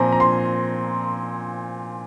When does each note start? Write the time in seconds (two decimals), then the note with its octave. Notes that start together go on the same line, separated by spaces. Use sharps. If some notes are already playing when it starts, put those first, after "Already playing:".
Already playing: A#2 F3 C4 G#5 A#5
0.12 A#5
0.20 C6